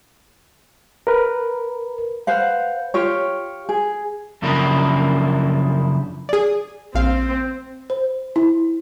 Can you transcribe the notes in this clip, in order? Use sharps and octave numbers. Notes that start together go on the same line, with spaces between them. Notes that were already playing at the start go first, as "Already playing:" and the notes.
A#4 B4
B4 C5 F5 F#5
F4 G4 C#5
G#4
F#2 C#3 F3 A#3 D4 E4
G#4 D5
A#1 C4 F5
C5
E4